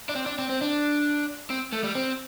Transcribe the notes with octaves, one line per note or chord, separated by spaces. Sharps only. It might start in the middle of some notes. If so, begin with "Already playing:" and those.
D4
C4
D4
C4
C4
D4
C4
A3
G3
C4